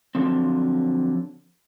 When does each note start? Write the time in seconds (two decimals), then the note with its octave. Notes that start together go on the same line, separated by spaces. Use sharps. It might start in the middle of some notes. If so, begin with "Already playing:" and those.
0.15 D3 F3 F#3 C4